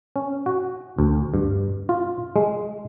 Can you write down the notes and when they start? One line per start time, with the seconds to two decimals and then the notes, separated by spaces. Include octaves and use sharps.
0.16 C#4
0.46 F#4
0.99 D2
1.34 G2
1.89 F4
2.36 G#3